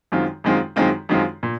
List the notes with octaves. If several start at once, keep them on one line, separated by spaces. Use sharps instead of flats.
F#2 D#3 G#3 C4 F4
F#2 D#3 G#3 C4 F4
F#2 D#3 G#3 C4 F4
F#2 D#3 G#3 C4 F4
A#2